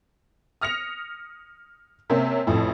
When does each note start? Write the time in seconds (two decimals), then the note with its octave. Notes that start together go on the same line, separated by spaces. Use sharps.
0.61 D#6 F6 A#6 C#7 F7
2.10 C3 A#3 C4 C#4
2.47 A1 F2 A2